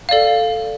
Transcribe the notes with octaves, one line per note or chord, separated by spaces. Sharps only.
A4 D5 F5